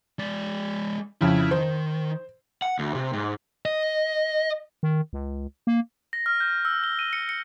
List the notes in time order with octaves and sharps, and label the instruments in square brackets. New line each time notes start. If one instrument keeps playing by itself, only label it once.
[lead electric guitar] G#3 D5
[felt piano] F2 C#3 [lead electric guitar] E4
[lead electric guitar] D#3 [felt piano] C5
[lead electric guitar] F#5
D2
C3
G#2
D#5
[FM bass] D#3
C#2
A#3
[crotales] A#6
F6
G6
E6
G7
D#7
C#7
C#7